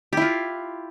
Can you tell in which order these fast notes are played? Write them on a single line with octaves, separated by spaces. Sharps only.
G4 E4 F4